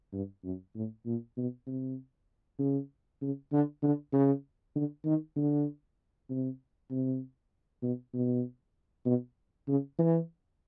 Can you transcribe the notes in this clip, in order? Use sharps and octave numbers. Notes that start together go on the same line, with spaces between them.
G2
F#2
A2
A#2
B2
C3
C#3
C#3
D3
D3
C#3
D3
D#3
D3
C3
C3
B2
B2
B2
C#3
E3